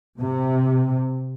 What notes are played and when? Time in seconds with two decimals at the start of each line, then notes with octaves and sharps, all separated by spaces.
0.19 C3